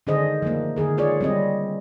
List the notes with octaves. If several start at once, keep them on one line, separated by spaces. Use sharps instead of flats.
D3 D#3 D4 G#4 C5 D#5
F3 A3 A#3
D3 D#3 G#4 A#4
F4 G#4 C#5 D5
G3 C4 D#5